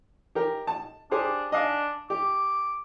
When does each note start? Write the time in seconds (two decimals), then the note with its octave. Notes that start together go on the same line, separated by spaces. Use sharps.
0.35 G4 A#4 G5
0.67 A5
1.11 D4 G4 G#4 C5
1.52 D4 D#5 F5 G#5
2.10 G4 D6